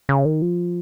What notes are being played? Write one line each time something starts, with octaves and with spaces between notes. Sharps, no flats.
C#3
D#3
F3